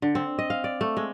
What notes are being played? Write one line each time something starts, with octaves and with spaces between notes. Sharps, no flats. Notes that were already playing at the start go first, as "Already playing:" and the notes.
D3
C4
D#5
F5
D5
A3
G#3